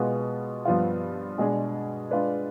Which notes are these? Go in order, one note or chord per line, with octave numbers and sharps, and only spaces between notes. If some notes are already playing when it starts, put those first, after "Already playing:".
Already playing: B2 G#3 B3 F4
G2 F3 B3 F4
B2 G#3 D4 G#4 D5
G#3 D4 F4 B4 D5